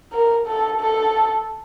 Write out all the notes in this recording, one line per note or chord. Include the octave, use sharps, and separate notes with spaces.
A#4
A4
A4